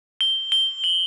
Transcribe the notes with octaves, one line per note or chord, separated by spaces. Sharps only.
G7
G7
F#7